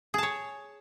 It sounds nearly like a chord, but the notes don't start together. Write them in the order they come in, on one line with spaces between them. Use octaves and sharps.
G#4 A5 C#5